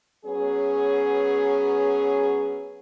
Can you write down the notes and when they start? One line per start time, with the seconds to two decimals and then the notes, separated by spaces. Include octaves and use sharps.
0.25 F#3 B3 C#4 G#4